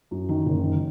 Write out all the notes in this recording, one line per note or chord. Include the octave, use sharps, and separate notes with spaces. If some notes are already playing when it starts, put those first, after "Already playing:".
F#2
D#3
F#1
D#3